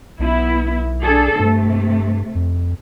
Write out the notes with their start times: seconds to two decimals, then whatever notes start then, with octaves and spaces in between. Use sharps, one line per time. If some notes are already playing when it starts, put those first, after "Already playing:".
0.19 B1 B3 E4
1.03 D4 G#4 A4
1.39 G2 C3 A3
2.35 F2